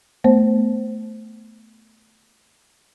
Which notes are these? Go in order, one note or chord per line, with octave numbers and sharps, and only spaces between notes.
A3 B3 C5